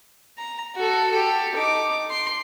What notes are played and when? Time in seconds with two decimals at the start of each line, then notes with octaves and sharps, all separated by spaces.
0.38 A#5
0.76 F#4 A4
1.11 G4 A4
1.55 D#4 D6
2.10 C6